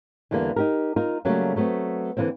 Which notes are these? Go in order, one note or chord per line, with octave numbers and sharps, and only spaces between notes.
E2 D3 E3 G3 A#3
D#4 G4 A#4
D#4 F4 A#4
C#3 F#3 G3 A3 A#3 C#4
F#3 A3 B3 C4
D3 E3 F3 A#3 C4